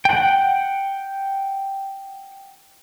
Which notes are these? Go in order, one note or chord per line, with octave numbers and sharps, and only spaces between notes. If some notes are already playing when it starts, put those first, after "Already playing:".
F#5 G5